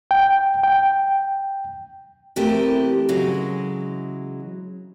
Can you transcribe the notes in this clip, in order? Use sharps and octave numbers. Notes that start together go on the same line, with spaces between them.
G5
G5
C3 E3 A3 B3 G4 A#4
C#3 E3 F#3 G#3